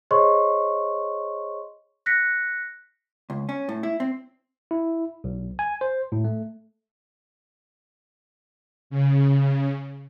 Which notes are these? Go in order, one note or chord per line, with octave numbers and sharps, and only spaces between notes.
G#4 C5 C#5 D#5 C6 C#6
F#6 A#6 B6 C#7
C#2
C#4
A2
E4
C4
E4
B1
G#5
C5
A2
A3
C#3